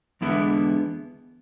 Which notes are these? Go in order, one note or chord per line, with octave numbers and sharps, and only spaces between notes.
E2 D3 G#3 B3 E4